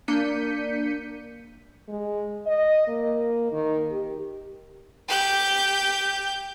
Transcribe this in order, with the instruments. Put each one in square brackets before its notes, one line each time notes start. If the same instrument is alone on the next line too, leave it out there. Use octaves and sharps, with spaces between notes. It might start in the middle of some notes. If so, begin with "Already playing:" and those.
[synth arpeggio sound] A#3 D4 G6 B6 C#7 D#7
[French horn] G#3
D#5
A#3
D#3
G4
[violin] G4 G6